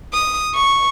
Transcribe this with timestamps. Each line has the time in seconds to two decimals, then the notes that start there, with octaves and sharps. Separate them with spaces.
0.13 D#6
0.54 C#6